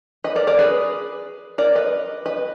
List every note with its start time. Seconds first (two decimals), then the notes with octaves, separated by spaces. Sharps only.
0.24 B4 D#5
0.36 A#4 D5
0.47 A#4 D5
0.59 G#4 B4
1.58 A#4 D5
1.75 B4 D#5
2.26 B4 D#5